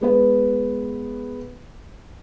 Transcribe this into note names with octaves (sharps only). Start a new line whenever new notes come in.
G#3 B3 B4